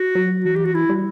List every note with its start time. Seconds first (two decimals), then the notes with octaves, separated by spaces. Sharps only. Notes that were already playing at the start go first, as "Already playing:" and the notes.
Already playing: F#4
0.15 F#3
0.44 E3 F#4
0.56 G4
0.65 F#4
0.75 E4
0.89 G3